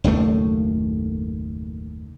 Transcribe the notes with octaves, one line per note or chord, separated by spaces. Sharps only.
F#1 D#2 A2 A3